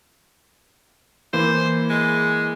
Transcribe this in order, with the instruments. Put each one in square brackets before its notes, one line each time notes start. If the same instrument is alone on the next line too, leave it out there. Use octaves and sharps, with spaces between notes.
[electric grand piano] E3 A#3 E4 [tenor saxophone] C5
[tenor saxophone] G#3